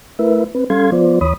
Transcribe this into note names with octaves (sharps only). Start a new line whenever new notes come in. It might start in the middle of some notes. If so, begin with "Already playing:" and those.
A3 E4 A#4 B4 E5
C4 B4
G3 C#4 A4 F5 C6 G#6
F3 B3 F4 C5 D5
D#2 E3 C#5 B5 D#6